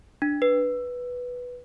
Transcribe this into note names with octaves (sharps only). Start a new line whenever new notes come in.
D4
B4